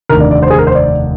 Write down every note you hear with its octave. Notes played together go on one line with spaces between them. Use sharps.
F1 D#2 D3 A#4
D5
D5
C5
G#4
A#4
C5
D5